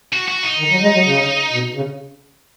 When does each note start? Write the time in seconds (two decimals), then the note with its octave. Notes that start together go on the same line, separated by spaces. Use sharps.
0.13 F#4
0.28 F#4
0.44 D#4
0.59 D#3
0.71 F#3
0.82 G#3
0.94 F#3
1.05 C#3
1.52 B2
1.74 C#3